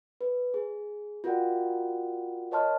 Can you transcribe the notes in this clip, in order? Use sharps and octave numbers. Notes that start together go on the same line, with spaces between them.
B4
G#4
F4 F#4 A#4 D5 F#5 G5
A#4 C#5 D#5 A5 C6 F6